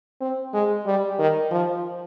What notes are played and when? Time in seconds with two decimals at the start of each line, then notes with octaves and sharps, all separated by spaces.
0.21 C4
0.53 G#3
0.86 G3
1.19 D#3
1.51 F3